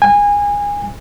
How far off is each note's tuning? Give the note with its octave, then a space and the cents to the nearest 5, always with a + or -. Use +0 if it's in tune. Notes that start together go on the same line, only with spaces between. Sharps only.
G#5 -25